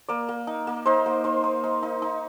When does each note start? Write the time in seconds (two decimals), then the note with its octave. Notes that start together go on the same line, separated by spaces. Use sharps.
0.08 A#3 D5
0.29 A#3
0.47 D#4
0.67 A#3
0.86 D#4 C5
1.06 A#3
1.24 D#4 C5
1.44 D#4
1.64 D#4
1.83 D#4
2.02 D#4